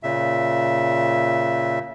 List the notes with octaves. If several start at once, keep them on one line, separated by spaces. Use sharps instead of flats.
A#2 C#3 E5